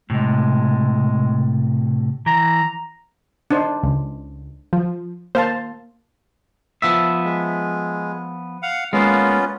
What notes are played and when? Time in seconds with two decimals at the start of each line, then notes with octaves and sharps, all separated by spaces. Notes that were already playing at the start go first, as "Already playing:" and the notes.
0.10 A2 C3 G#3
2.26 E3 A#5
3.51 D4 D#4 C5
3.83 C#2
4.73 F3
5.35 A#3 C5 F5 A5
6.82 F3 B3 E5
7.25 G#3
8.62 F5 F#5
8.93 G#3 A#3 B3 C#4 F4